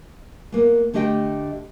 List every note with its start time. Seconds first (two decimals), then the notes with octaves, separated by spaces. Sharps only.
0.52 A#3 B3
0.94 D3 A3 G4 D#5 E5 G5